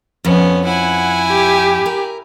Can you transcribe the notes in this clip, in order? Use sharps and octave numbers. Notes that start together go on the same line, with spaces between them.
F2 B3 C#4
E4 F#5 G#5
G4
A#4